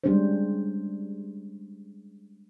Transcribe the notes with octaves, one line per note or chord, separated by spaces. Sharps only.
G3 G#3 C#4 D4 C5